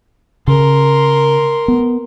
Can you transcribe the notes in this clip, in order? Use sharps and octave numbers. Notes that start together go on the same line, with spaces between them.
C#3 A#4 C6
B3